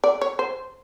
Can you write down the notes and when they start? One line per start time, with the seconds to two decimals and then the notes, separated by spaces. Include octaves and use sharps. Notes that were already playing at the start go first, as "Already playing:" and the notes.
0.04 D5
0.21 C#5
0.39 C5